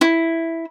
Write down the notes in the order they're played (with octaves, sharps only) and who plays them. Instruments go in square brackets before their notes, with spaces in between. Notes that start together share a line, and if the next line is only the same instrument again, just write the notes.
[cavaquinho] E4